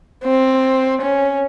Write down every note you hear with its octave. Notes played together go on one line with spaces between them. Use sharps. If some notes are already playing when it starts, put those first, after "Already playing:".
C4
C#4